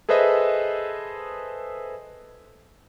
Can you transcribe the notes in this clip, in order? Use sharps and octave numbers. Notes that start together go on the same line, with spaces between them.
G#4 A4 B4 C5 D#5 E5